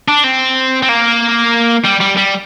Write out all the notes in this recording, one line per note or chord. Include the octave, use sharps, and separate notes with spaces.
D4
C4
C4
A#3
G3
G3
G3